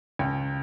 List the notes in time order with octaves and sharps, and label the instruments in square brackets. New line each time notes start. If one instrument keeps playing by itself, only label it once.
[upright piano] C#2 G5